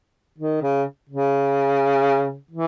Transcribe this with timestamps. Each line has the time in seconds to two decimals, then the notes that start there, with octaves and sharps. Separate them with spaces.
0.38 D#3
0.62 C#3
1.09 C#3
2.51 E3